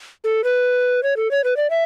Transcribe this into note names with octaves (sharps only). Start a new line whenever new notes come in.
A4
B4
C#5
A4
C#5
B4
D5
E5